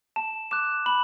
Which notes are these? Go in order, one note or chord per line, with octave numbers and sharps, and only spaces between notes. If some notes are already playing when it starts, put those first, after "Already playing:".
A5 E7
D6 F#6 E7
B5 F#7